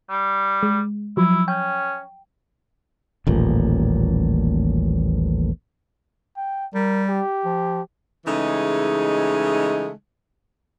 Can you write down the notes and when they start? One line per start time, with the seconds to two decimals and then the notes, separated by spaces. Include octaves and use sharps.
0.10 G3
0.63 G#3
1.17 F3 F#3 E4
1.48 C#4 G5
3.27 D#1 A1 A#2
6.37 G5
6.74 G3 A#4
7.09 G4
7.45 F3
8.25 C#3 E3 G#3 A3 D#4